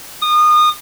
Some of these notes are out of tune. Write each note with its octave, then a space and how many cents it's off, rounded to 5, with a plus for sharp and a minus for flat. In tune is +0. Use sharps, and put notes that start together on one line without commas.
D#6 -30